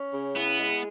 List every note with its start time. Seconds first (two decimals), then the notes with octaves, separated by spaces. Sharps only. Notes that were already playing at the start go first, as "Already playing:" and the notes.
Already playing: C#4
0.13 C#3
0.35 B3 E4
0.57 G#3